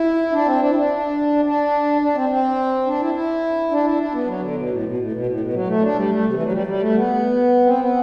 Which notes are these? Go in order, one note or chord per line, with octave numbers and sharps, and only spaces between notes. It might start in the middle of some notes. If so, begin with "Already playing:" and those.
Already playing: E4
D4
C4
D4
E4
D4
D4
D4
C4
C4
D4
E4
E4
D4
E4
D4
B3
F#3
D3
B2
A2
B2
A2
B2
A2
B2
F#3
A3
D4
G3
A3
C3
E3
F#3
G3
G3
A3
B3
C4
B3